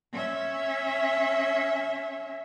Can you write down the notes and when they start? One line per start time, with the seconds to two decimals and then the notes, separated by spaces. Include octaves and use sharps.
0.13 C#4 E5